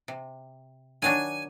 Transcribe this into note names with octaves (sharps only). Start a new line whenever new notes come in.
C3
D#3 F#3 D4 G#5